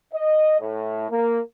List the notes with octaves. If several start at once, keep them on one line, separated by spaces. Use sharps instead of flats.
D#5
A2
A#3